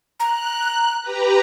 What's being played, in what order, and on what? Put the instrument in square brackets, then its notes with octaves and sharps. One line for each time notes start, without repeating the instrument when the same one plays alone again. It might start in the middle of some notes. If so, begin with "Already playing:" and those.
[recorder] A#5 [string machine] F#6
[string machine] G4 B4 A#5